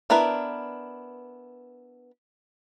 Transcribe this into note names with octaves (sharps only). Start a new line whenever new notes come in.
B3 D4 E4 A#4 B4